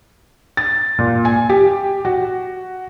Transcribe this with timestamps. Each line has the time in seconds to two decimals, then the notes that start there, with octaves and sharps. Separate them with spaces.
0.57 A6
0.99 A#2
1.25 G#5
1.49 G4
2.05 F#4